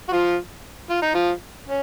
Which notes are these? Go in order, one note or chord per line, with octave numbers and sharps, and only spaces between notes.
F#4
F3 F4
F4
D#4
F3 F4
C#4